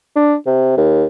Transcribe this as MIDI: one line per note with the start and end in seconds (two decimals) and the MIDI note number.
0.16 0.35 62
0.46 0.76 48
0.77 1.06 39